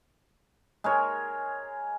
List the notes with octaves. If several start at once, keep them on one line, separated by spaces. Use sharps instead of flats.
G#3 A#4 C#5